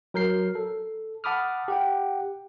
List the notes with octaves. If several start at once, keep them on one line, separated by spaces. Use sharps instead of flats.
F#3 A#4 G6 C7
A4
F#5 A5 B5 D6 D#6 F6
G4 F#5 G5